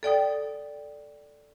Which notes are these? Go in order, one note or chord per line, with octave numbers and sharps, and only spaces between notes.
A4 D5 G5 D#6